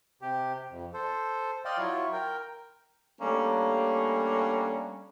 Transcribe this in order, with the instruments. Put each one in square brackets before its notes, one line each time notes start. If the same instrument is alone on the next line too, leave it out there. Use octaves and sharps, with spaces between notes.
[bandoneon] C3 G4
F2
A4 C5
D5 D#5 F5 G5 C6
F#3 E4 F4 C#5
A#4 G5
[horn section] G3 A3 A#3 C#4 D4